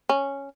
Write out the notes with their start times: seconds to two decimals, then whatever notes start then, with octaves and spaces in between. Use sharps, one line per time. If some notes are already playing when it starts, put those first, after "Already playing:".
0.09 C#4